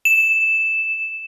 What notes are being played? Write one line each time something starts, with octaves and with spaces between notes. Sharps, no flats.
E7